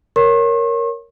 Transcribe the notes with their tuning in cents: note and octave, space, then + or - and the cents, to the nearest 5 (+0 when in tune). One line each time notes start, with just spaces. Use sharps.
A#4 +0 C#5 +0 C#6 -45